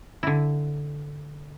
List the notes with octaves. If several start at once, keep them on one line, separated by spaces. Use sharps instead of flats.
D3 E4